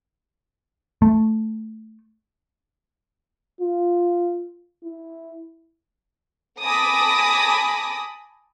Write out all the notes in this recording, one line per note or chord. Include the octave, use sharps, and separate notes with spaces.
A3
F4
E4
G#5 A5 B5 D6 D#6 A#6